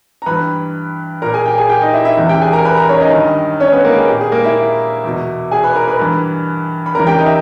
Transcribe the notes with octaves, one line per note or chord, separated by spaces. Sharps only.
A#5
G2 E3 B4 B5
A#2 A#4 A#5
G#4 G#5
G4 G5
G#4 G#5
G4 G5
D#4 D#5
E4 E5
E4 E5
E2 C#3 E3 E4 E5
G4 G5
G#4 G#5
A#4 A#5
B4 B5
A#4 A#5
C#4 C#5
D#4 D#5
G2 D#3
C#4 C#5
B3 B4
A#3 A#4
G#4
A#2 G4
G#4
A#3 A#4
E4 E5
E2 B2
G#4 G#5
B4 B5
A#4 A#5
B4 B5
G2 E3
B5
E2 C#3 E3 A#4 A#5
G4 G5
D#4 D#5
E5